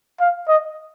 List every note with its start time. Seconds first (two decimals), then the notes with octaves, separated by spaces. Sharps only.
0.20 F5
0.48 D#5